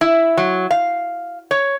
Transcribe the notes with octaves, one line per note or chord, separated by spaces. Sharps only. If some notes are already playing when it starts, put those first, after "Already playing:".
E4
F#3
F5
C#5